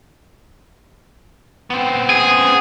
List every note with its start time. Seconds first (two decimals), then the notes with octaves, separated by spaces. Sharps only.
1.70 B3 C4
2.10 G#4